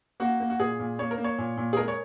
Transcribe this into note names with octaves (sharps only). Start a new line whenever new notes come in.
A#3 F#4
A#3
F#4
A#2 G#4
A#2
A#3 C#5
A#4
A#3
C#5
A#2
A#2
G#4
G#3 A#4
C#5